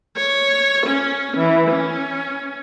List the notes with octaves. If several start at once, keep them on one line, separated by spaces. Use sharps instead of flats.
C#5
C#4
E3
C#4